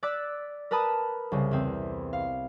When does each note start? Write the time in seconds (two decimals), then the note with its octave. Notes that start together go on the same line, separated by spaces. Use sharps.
0.03 D5 D6 E6 F#6 A6 B6
0.71 A#4 B4 A5 B5 D#6
1.32 C2 C#3
1.51 E2 C4
2.13 F5